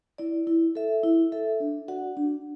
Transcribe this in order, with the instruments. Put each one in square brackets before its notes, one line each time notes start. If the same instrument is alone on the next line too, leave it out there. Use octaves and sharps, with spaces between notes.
[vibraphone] E4 D5
E4
A4 E5
E4
A4 E5
D4
F#4 D5 F#5
D4